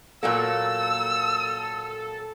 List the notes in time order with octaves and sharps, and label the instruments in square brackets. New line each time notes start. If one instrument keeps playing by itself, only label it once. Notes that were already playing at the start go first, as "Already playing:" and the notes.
[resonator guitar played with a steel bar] A#2 F#3 A#3 [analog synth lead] A4 [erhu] E6